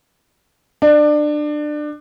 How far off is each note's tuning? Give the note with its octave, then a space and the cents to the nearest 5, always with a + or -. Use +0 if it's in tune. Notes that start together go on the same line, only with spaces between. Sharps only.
D4 +25